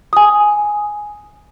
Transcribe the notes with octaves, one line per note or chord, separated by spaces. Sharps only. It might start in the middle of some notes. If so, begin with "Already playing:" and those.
G#5 D#6